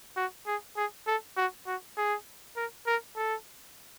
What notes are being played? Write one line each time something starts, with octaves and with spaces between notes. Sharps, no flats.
F#4
G#4
G#4
A4
F#4
F#4
G#4
A#4
A#4
A4